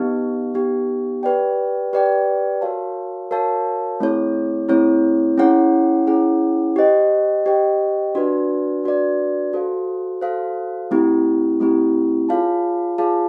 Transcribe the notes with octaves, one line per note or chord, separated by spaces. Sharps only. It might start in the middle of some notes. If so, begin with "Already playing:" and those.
Already playing: B3 D#4 G4
B3 D#4 G4
G4 B4 D5 G5
G4 B4 D5 G5
F#4 A#4 C#5 F5 A5
F#4 A#4 C#5 F5 A5
A3 C4 E4 G#4 C#5
A3 C4 E4 G#4 C#5
C#4 E4 G#4 C#5 F#5
C#4 E4 G#4 C#5 F#5
G4 C5 D#5 G5
G4 C5 D#5 G5
D4 F#4 B4 D5
D4 F#4 B4 D5
F#4 A4 C5 F5
F#4 A4 C5 F5
A3 C4 E4 G4
A3 C4 E4 G4
F4 G#4 C#5 F5 A5
F4 G#4 C#5 F5 A5